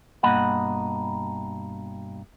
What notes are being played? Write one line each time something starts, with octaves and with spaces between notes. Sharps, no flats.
G2 B2 A#3 D#5 F#5 B5